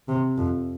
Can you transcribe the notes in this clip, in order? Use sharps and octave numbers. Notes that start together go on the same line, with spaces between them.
C3
F2